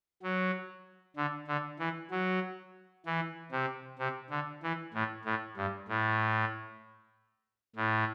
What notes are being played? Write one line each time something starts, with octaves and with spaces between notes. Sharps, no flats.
F#3
D3
D3
E3
F#3
E3
C3
C3
D3
E3
A2
A2
G2
A2
A2